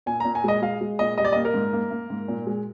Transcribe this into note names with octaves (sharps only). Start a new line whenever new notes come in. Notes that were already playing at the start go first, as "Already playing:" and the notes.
A#2 G#5
A#2 A#5
G#5
G#3 D#5
G#3 F5
G#3
A#2 D#5
G3 D#5
D5
A#3 D#5
A#4
G#2
A#3
A#3
G#2
A#2
G#3